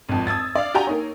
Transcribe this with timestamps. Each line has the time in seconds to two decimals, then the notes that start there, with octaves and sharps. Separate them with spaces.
0.09 G#1 F2
0.27 D#6 E6 G#6 A6
0.55 D5 F5
0.74 F#4 G4 G5 G#5 A#5
0.87 A#3 D#4 C#5